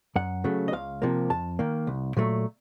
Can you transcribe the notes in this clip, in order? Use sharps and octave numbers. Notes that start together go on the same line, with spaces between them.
F#2 F#5
C#3 F#3 A3
D#5
C#2 F5
C3 F3 A#3
F2 A5
D#3 A#3
C2
A#2 F#3 A3